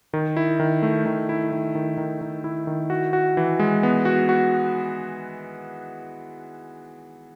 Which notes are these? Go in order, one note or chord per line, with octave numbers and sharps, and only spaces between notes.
D#3
E4
D#3
A3
D#3
E4
D#3
D#3
D#3
D#3
E4
D#3
F#4
F#4
E3
G#3
B3
F#4
F#4